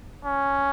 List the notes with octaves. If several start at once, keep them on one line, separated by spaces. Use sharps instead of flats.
C#4